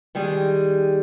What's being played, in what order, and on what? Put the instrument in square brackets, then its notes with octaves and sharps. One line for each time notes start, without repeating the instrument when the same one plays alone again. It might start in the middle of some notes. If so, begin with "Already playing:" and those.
[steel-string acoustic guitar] D#3 G3 G#3 G#4